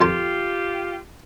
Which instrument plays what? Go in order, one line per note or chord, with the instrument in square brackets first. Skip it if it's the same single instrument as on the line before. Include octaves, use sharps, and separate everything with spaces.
[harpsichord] F2 A5 C6 [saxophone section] F4 G4